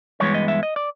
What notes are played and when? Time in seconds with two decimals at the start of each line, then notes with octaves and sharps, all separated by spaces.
0.20 G2 E3 G#3 B3 C#5
0.34 D#5
0.48 E5
0.63 D#5
0.76 D5